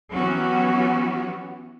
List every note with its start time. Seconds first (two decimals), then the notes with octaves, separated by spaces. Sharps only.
0.12 E3 F#3 B3 C#4 F#4 G4